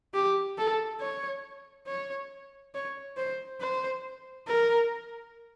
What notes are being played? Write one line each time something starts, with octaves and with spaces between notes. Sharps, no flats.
G4
A4
C#5
C#5
C#5
C5
C5
A#4